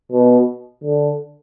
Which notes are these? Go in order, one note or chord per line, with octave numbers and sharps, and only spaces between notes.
B2
D3